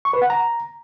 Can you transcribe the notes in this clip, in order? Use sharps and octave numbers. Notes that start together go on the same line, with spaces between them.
C#6
B4
F#5
A#5